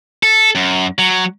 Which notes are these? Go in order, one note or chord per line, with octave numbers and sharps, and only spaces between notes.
A4
F#2
F#3